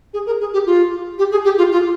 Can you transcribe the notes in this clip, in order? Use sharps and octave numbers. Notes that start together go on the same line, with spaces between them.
G#4
A#4
G#4
G4
F4
G4
G#4
G4
F4
F4